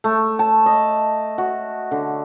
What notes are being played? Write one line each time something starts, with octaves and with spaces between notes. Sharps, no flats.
A3
A5
D#5
F#4
D3